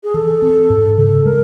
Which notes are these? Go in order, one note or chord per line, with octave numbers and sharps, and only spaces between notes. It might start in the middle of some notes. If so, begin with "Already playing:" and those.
G#4
E3 A4
C4
G#2
C#3 A4
G#3 A#4